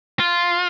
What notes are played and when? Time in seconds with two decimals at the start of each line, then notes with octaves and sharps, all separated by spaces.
0.20 F4